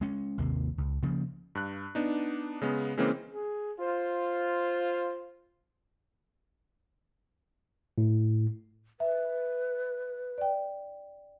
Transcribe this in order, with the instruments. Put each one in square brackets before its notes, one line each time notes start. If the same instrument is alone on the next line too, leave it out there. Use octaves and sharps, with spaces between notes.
[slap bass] G#3 C#4
G#1 D#2 C3 A#3
C#2
C#3 F3 A#3
[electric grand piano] G2 F#6
B3 D4 D#4
C#3 G#3 B3
C#3 E3 G#3 A#3 C4 C#4
[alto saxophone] G#4
[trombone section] F4 [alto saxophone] C5
[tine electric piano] A2
[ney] B4 [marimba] E5
[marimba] D5 G5